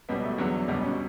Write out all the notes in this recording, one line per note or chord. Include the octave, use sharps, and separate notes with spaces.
C#2 B2 G3 B3
A3
E2 D3 F#3 B3
D4
C#2 B2 G3 D4
C#4